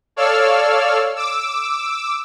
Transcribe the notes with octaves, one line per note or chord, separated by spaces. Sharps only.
A4 C#5 D5 F5 E6 F6
D6 E6